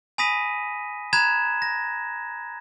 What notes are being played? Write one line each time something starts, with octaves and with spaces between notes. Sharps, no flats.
G#5 B5 D#6 A#6 B6 D#7
A#5 B5 F#6 G#6 E7
A#6